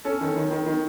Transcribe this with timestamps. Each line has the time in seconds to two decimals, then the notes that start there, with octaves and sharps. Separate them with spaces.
0.05 C#4 A4
0.21 D#3
0.36 D#3
0.51 D#3
0.66 D#3